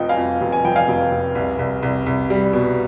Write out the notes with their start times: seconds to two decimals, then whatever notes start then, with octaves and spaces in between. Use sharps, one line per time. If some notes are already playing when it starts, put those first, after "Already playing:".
Already playing: F1 F2 F3 D#5 G5
0.09 F5 G#5
0.17 F2
0.41 F1
0.52 G#5
0.65 F3 G5
0.76 F5 G#5
0.88 F1
1.11 F1
1.35 C2
1.59 C2
1.83 C2
2.06 C2
2.30 G3
2.53 B2